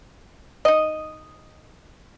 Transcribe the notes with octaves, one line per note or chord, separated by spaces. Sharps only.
D#4 D#5